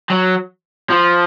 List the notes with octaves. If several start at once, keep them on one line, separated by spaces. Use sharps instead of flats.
F#3
F3